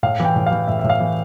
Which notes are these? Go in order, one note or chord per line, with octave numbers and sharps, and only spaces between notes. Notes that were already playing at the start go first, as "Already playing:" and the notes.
A2 F5
E3
G5
A2
F5
E3
A2 E5
A2 E5
F5
E3